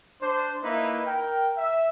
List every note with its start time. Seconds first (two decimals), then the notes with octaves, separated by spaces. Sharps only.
0.21 D4 C5
0.63 A#3 D#4 E4 B4 E5
1.05 A#4 G5
1.57 E5